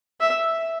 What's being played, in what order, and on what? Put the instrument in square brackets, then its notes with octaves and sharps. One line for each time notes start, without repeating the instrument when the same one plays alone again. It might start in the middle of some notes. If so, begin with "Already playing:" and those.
[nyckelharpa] E5